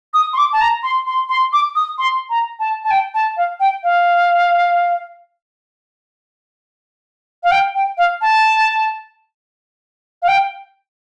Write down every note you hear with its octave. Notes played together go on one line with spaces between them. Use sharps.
D#6
C6
D6
A5
A#5
C6
C6
C6
D6
D#6
C6
A#5
A5
A5
G5
A5
F5
G5
F5
F5
G5
G5
F5
A5
F5
G5